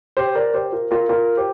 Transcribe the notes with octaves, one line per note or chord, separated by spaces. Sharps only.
G4 C5
A#4 D5
G4 C5
F4 A#4
F4 A#4
F4 A#4
G4 C5